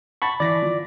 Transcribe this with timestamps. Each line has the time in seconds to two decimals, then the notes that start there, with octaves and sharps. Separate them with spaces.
0.22 F#5 A5 B5 C#6 A6
0.40 E3 D5 A#6 B6
0.62 F3